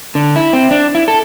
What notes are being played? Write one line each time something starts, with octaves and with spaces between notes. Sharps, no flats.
D3
E4
C4
D4
E4
A4